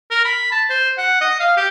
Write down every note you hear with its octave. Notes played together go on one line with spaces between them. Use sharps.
A#4
B5
A5
C5
F#5
D#5
F5
G4